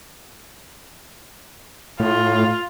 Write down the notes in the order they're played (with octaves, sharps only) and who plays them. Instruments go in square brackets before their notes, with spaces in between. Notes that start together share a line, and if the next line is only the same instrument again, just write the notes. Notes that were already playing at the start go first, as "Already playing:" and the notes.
[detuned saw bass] A2 [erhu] F4